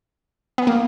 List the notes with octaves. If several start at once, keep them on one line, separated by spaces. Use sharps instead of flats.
B3
A#3